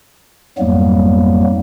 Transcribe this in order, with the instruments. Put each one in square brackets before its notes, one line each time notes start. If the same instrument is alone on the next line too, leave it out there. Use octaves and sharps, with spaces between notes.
[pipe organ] F2 G#2 F#3 G3 A#3 B3